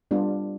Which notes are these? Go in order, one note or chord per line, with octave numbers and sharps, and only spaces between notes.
G3 B3 D4 F4